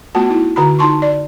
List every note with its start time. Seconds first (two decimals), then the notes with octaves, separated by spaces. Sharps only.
0.15 A3 B3 F4 F#4 A5
0.28 A3 D#4 E4
0.56 D3 F#4 A#5 B5
0.79 D#4 F4 A5 C6 C#6
1.02 D5